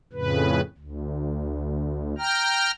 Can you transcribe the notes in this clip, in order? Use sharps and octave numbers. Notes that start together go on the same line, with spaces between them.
F2 A2 C#3 B4
D2
G5 A#5 F6